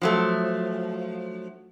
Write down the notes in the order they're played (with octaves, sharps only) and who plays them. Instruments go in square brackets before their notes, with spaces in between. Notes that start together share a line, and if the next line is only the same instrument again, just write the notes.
[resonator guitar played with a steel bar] F3 F#3 A3